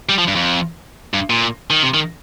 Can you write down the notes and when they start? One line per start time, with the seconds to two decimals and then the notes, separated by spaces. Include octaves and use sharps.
0.09 G3
0.18 F3
0.27 G2
0.35 F2
1.14 G2
1.30 A#2
1.70 D#3
1.82 C3
1.94 D#3